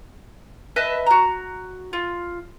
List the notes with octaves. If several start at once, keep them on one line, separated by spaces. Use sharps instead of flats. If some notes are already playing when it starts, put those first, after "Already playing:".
B4 D#5 E5 A5
F#4 A#5
F4